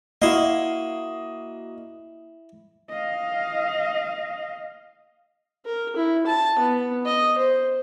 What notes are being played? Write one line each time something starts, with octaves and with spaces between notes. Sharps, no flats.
A#3 E4 F#4 D#5 C6
D#5 F5
A#4
E4
A5
B3
D#5
C5